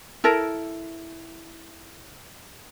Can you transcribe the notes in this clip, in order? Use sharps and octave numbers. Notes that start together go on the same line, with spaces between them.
E4 A4 A#4